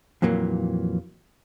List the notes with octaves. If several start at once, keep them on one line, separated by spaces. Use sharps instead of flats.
F2 A#2 E3 F#3 A#3